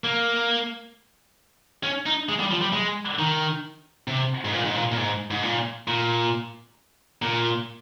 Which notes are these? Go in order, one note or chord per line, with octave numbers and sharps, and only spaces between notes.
A#3
C#4
D#4
G#3
G3
F3
G3
G#3
D#3
C3
G#2
A#2
G#2
A#2
A#2
G#2
G#2
A#2
A#2
A#2